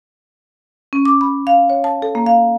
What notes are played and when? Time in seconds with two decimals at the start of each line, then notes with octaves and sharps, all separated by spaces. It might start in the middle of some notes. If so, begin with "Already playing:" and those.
0.93 C#4
1.05 D6
1.21 B5
1.47 F5
1.70 C#5
1.84 A5
2.02 A4
2.15 A#3
2.26 F5